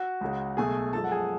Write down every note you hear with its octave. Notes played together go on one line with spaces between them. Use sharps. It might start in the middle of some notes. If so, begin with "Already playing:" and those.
Already playing: F#4 F#5
C#2 C#3 G#3
B1 B2 A3 G#4 G#5
F#2 F3 G#3 A4 A5
F#5
G#4 G#5